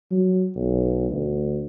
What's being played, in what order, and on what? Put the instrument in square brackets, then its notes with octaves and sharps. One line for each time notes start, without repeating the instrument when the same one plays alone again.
[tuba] F#3
B1
D2